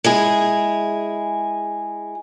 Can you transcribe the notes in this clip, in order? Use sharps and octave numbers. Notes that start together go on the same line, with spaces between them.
G#3 E4 G#4